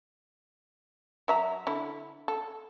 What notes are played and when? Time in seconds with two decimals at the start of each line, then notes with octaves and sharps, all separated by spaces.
1.28 F#3 E5 A#5
1.67 D3 E4
2.28 A4